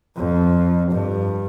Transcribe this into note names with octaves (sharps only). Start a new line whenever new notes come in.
F2
G2